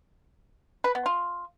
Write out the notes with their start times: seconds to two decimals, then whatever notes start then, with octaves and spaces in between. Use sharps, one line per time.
0.84 B4
0.95 B3
1.06 F4